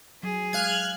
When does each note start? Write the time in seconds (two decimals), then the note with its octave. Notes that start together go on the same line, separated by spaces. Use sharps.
0.23 F#3 G#4
0.53 G#3 F5 F6 F#6 G#6